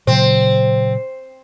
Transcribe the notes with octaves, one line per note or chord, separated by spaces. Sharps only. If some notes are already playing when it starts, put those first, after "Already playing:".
A#2 C#3 F#3 C4